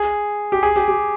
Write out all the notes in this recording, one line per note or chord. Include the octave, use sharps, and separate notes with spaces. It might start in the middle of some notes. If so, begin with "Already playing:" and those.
Already playing: G#4
G4
G#4
G4
G4